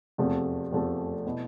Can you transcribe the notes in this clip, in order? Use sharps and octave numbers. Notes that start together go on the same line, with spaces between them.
F1 E2 C3 F3 A3
F1 E2 C3 F3 A3
B2 B3 E4